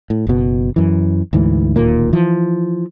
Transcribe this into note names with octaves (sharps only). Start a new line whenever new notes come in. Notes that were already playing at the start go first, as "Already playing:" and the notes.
A2
F#1 B2
F#2 E3
D2 G#2 E3
D1 D#2 A#2 A#3
E3 F3